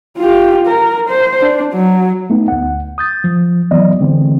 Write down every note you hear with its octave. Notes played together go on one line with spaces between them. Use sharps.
F4 G4
A#4
C5
D4
F#3
A3 B3 D#4
D2 F#5
D#6 G6 A6
F3
E3 F#3 B3 D5 D#5
D3 E3 G#3 C4